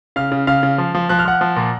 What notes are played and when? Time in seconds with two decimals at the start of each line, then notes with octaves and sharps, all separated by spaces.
0.16 C#3 F5 F6
0.32 C#3
0.47 C#3 F5 F6
0.63 C#3
0.78 F3
0.95 F3
1.09 F3 F#6
1.19 F6
1.25 F3 F#5 F#6
1.41 F3
1.56 A#2